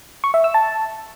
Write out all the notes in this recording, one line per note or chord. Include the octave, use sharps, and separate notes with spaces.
C#6
E5
E6
A5